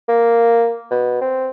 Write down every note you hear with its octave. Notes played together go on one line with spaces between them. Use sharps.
A#3
B2
C4